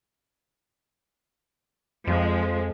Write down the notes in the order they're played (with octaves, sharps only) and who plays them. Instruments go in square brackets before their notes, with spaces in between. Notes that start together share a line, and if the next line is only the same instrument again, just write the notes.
[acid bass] F2 [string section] F3 G#3